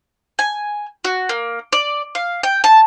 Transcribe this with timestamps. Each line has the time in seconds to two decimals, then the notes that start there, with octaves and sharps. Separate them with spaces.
0.39 G#5
1.05 F#4
1.29 A#3
1.72 D5
2.15 F5
2.43 G5
2.64 A5